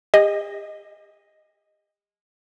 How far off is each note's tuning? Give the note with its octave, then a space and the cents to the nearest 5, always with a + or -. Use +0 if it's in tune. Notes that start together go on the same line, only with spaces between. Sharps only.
G4 +45 D#5 +0